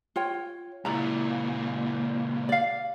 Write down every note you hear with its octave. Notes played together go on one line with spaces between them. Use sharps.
F4 C#5 G5
C#2 A#2 E4 D5 A#5
D5 F5